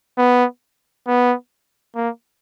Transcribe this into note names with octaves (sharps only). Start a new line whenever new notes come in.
B3
B3
A#3